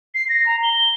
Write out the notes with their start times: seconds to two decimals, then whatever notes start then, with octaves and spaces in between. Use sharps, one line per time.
0.15 C7
0.29 A#6
0.46 A#5
0.63 G7